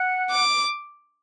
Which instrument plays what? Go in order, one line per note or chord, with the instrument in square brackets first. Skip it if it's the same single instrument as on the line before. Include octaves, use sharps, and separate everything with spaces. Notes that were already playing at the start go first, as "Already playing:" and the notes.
Already playing: [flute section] F#5
[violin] D6